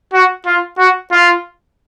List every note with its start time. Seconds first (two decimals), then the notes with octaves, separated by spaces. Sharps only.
0.13 F#4
0.46 F4
0.78 F#4
1.11 F4